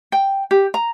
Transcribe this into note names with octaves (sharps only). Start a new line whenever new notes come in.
G5
G4
A#5